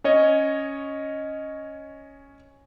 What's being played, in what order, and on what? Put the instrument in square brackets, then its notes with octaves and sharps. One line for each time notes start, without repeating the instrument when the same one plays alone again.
[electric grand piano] C#4 C#5 D#5